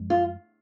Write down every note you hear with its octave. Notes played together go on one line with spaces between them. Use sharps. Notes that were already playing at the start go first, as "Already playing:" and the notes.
Already playing: F#2 F3 G#3
F4